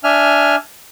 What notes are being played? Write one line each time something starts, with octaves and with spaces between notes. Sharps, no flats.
D4 E5 G#5 F6